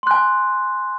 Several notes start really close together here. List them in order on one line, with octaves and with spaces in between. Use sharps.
C6 F#6 G#5